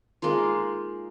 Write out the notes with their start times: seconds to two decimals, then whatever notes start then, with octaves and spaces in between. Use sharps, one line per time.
0.22 G#3 A#3 D#4 F4